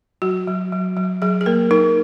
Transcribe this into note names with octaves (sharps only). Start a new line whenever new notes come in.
F#3 F#4
F#3
F#3
F#3
F#3 G#4
G#4
A#3 A#4
D#4 A#4